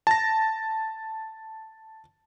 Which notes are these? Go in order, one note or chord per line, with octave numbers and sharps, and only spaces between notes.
A5 A#6